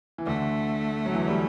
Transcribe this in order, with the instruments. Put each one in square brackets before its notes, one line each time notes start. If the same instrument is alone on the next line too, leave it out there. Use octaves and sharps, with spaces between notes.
[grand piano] E3
[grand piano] D2 D3 [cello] A3
[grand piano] F#3
E2 E3
G3